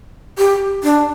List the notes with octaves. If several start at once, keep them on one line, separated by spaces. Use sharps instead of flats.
G4
D4